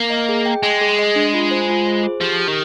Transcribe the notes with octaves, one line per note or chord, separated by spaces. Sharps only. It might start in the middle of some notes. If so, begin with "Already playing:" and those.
Already playing: A#3
D#5
G#4
G5
G#3 G#4
G#4
D#5
D4
F4
C5
F4
C5
G#4
F3 G4
G4
D#3